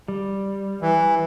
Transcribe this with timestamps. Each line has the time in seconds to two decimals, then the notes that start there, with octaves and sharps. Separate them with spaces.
0.08 G3
0.81 E3